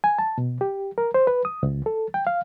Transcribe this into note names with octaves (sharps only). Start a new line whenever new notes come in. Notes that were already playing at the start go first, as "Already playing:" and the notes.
G#5
A5
B2
G4
A#4
C5
B4
D#6
C#2
A4
G5
F5